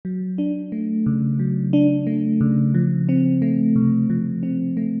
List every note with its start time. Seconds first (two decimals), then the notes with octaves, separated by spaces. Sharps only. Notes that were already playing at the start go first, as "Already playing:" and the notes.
0.05 F#3
0.38 D4
0.72 A3
1.06 C#3
1.39 F#3
1.73 D4
2.07 A3
2.41 C#3
2.74 F3
3.09 C4
3.42 A3
3.76 C3
4.10 F3
4.43 C4
4.77 A3